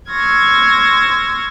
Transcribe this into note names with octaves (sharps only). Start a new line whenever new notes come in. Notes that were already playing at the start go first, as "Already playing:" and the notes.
C6 C#6 E6 F6 G#6 A#6